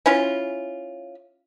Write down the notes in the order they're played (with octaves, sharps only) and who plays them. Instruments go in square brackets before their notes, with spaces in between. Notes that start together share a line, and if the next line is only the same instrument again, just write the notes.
[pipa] C#4 E4 F4